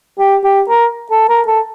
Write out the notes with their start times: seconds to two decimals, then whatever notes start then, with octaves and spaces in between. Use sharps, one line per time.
0.19 G4
0.44 G4
0.69 A#4
1.11 A4
1.29 A#4
1.47 A4